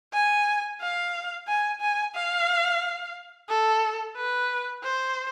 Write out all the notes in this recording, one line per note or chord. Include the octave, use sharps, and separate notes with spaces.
G#5
F5
G#5
G#5
F5
A4
B4
C5